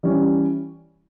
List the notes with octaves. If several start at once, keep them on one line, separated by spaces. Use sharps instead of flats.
E3 G3 C#4